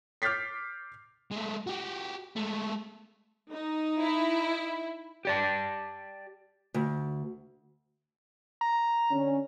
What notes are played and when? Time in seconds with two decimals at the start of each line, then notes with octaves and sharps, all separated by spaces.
0.22 D6 F6 G6 A6 B6 C7
1.32 G#3 A3
1.67 F#4 G4
2.36 G#3 A3
3.50 D#4
4.02 E4
5.25 G4 D5 A5
6.74 D2
8.61 A#5
9.11 D3 C#4